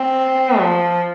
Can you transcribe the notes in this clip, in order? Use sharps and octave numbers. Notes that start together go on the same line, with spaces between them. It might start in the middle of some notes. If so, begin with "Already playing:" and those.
Already playing: C4
F3